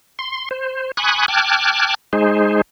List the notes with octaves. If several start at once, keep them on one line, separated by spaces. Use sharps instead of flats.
C6
C5
G#5 B5 C#6 D#6 F#6
G5 A5 D6 F6 F#6 G#6
G#3 D#4 G#4 C5